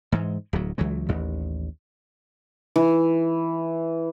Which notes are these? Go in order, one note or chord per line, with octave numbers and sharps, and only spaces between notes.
G#2 E3 G#3
D1 D2 F#3
C#2 E3 F#3 G#3
A1 D#2
E3